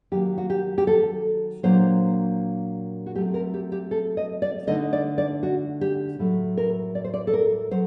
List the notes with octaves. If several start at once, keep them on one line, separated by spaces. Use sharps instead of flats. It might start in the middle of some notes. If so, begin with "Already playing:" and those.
D#3 F#3 A#3 G4
F#4
G4
G4
A4
A#2 F#3 A#3 D4 C5
F#4
F#3 A3 C4 G4
A#4
G4
G4
A4
D#5
D5
D3 A3 D#4 D#5
D5
D5
F#4
G4
A2 F#3 A3
A#4
D5
C5
D5
A4
A#4
F#3 C5